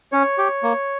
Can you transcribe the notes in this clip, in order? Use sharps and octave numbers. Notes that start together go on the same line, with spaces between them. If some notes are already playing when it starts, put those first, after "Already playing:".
C#4 C#5
G4
A#3